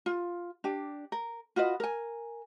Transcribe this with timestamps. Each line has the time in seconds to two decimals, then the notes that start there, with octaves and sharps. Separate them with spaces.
0.06 F4
0.64 D4 G4
1.12 A#4
1.56 F4 F#4 B4 D#5
1.80 A#4 G#5